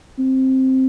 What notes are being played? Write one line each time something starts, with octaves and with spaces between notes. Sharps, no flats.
C4